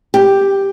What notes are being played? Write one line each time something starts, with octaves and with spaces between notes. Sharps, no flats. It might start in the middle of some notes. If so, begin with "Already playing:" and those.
G4